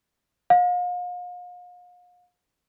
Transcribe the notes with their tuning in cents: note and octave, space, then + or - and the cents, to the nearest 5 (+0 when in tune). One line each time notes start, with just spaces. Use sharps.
F5 +40